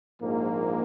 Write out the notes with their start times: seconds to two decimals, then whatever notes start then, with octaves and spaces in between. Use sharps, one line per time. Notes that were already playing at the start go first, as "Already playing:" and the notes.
0.22 A#1 G#2 F3 A#3